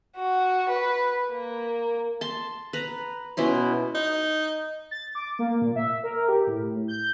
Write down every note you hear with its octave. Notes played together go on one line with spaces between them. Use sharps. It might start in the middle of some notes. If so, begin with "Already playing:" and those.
F#4
B4
A#3
A5 C6
B4 A#5
B2 C#4 E4 C6
D#4
A6
D6
A#3
A#2
E5
A#4
G4
A2
G6